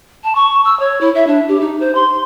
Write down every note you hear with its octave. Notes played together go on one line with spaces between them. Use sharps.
A5
C#6
E6
C#5
E4
E5
D4
G4
D#4
C5
C6